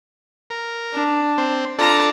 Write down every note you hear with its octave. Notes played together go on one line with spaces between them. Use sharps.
A#4
D4
C4
D4 F4 A4 A#5